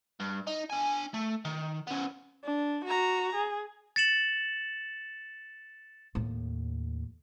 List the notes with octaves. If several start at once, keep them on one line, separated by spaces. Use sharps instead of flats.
G2
D#4
D4 G#5
A3
D#3
B3 C#4
D4
F#4 A#5
G#4
A6 C#7 E7 F#7
D#2 A2